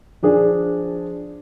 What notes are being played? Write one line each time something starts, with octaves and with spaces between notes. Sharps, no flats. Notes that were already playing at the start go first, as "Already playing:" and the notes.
F3 D4 G#4